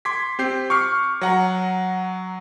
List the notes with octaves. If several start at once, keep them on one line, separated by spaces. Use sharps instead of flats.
C6 D6 G#6 B6
C4 G4 G6 C7
C#6 D6 F6 C7
F#3 F#5 A#5